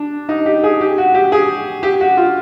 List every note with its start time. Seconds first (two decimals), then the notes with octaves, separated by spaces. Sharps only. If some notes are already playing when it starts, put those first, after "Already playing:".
Already playing: D4
0.29 D#4
0.46 G4
0.64 G#4
0.81 G4
0.98 F#4
1.14 G4
1.32 G#4
1.83 G4
2.01 F#4
2.17 F4